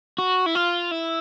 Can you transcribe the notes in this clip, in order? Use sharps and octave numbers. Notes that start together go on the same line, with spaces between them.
F#4
E4
F4
E4